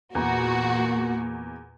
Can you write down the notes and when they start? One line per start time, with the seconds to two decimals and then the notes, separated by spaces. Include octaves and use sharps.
0.15 E2 A#2 A#3 F#4 A#5